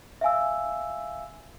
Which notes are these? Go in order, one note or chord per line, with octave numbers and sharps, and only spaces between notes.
E5 F5 G#5 E6